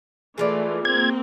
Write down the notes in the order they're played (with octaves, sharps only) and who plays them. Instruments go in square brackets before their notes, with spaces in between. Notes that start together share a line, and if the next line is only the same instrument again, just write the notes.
[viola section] E3 A3 [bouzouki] G#3 F4 D5
[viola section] A#3 C4 [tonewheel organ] G#6